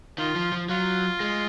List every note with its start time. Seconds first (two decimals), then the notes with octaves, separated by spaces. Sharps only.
0.18 D#3 F4
0.36 F3
0.52 F3
0.69 F#3 F4
1.20 G#3